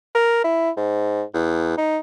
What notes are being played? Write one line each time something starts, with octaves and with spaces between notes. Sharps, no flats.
A#4
E4
G#2
E2
D#4